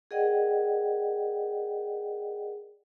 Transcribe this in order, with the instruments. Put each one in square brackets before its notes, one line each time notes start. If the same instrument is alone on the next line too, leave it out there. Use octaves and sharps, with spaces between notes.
[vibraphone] G#4 A#4 D5 D#5 F#5 G5